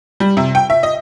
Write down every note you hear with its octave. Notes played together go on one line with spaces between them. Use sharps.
G3
C3
G5
E5
D#5